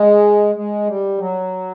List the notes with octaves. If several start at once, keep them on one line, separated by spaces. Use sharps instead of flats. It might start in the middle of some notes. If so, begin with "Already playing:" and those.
Already playing: G#3
G#3
G3
F#3